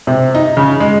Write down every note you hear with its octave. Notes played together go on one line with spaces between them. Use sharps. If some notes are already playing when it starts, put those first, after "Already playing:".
C3
D#4
C#3
G#3